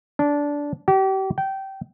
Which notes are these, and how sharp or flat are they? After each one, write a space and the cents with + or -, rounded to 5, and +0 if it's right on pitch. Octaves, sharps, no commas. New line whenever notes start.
D4 -15
G4 -35
G5 -20